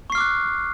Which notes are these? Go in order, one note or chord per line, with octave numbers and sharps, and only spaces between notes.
C#6 D6 F6 F#6 C7